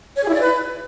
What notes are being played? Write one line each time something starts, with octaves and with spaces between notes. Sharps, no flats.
C#5
G#4
E4
D5
B4